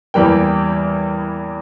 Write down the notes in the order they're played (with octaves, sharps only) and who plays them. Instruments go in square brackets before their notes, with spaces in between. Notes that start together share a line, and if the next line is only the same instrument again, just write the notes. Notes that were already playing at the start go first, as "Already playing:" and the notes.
[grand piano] E2 E3 G3 A#3 G5